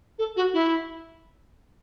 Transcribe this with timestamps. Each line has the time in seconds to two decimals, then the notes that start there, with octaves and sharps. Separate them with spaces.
0.18 A4
0.36 F#4
0.53 E4